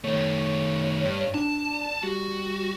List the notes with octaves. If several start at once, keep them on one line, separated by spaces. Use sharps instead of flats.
D#3 A3 C#5
G2
D4 A5
G3 F#4